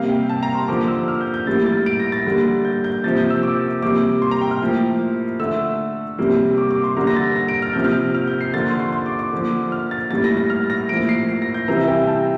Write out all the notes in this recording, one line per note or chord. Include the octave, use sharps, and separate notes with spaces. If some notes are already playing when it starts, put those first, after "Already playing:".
Already playing: C3 G3 A#3 F5
G5
A5
A#5
C6
D3 F3 A#3 D6
E6
F6
G6
G6
A2 G3 A#3 A6
A6
D7
A#6
A6
D3 G3 A#3
G6
G6
C3 F3 A#3 A6
G6
E6
D6
C3 G3 A#3 D6
C6
A#5
G5
F6
A2 F3 A#3
D3 A3 E6
C3 G3 A#3
D6
D6
C6
D3 G3 A#3 A#5
A#6
A6
A#6
D7
F6
C3 F3 A#3 G6
F6
F6
G6
C7
D3 F3 A#3 A6
C6
C6
C6
D6
D6
D3 F3 A#3
F6
A6
A2 G3 A#3 A6
A#6
A#6
F6
A#6
A2 F3 A#3 D7
C7
C7
A#6
G6
C3 E3 G3 A#5
E5
G5
F5
A5